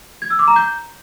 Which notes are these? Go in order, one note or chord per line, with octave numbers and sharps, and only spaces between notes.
G#6
E6
D6
A#5
G6